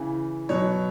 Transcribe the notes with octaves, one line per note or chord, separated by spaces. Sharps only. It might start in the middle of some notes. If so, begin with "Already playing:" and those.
Already playing: C#3 E3
B2 F#3 C#5